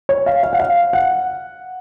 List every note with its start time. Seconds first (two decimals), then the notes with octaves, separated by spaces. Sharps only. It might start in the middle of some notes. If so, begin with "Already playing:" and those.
0.09 C#5
0.26 F5
0.43 F5
0.53 F#5
0.60 F5
0.93 F#5